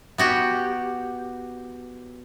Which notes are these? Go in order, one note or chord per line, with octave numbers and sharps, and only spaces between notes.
B3 F#4 G4